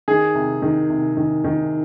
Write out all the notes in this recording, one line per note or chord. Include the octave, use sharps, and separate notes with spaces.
D#3 G#4
C3
D#3
C3
D#3
D#3